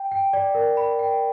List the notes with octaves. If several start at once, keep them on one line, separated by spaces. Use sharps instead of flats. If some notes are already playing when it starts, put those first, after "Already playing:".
Already playing: G5
G5
D5
A#4
B5
G5